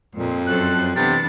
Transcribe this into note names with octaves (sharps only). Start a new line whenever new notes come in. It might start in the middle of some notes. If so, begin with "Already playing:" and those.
F2 A#2
F#2 A4 C5 F#6
C3 E3 B3 D4 A6